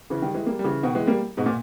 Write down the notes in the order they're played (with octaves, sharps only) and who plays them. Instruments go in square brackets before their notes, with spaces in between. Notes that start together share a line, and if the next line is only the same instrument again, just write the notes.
[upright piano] C#3 E3
D#3 G3
E3 G#3
G3 A#3
G3
C#3 E3
B2 D#3
E3 G#3
G3 A#3
G#2 B2
A#2